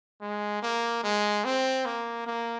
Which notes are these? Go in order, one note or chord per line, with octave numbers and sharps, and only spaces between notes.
G#3
A#3
G#3
C4
A#3
A#3